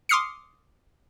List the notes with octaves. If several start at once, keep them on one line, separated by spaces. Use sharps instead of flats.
C6 D6 D#6 F6 C7 C#7